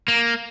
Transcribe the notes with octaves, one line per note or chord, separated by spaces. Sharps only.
A#3